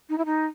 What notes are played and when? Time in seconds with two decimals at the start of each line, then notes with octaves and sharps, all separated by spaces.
0.09 D#4
0.18 E4
0.26 D#4